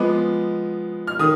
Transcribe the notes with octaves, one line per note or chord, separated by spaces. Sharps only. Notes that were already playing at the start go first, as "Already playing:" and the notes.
Already playing: F3 G#3 B3 D6
F6
D#3 D#6